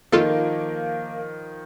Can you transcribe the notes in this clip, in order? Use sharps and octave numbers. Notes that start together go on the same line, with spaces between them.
D#3 F3 A#3 F4 A4